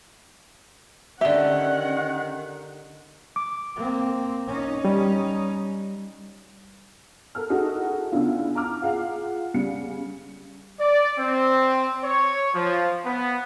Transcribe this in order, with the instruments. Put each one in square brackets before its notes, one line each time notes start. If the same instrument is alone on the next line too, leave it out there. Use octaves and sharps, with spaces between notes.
[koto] D3 G4 [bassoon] D#3 [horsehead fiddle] C#4 F#5 [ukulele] E5
[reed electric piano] D6
[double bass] A#3 C4
C#4 D#4
[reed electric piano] G3
[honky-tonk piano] A4 A#4 F6
D#4 E4 F#4 G#4 A4 D#6
C#3 B3 D4 E4 F4
A#5 D6 F6
F4 G#4 F5 F#5
C#3 G3 C#7
[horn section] D5
C4
C#5
F3
B3